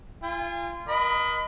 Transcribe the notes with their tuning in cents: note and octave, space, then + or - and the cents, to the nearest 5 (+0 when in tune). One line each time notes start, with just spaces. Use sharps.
F4 -30 G#5 -40
A#4 +40 D#5 +0 B5 +30